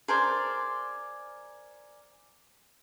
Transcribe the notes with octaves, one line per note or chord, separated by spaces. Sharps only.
G#4 A#4 C5 D5